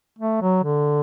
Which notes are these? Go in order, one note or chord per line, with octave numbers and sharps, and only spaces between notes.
A3
F#3
D3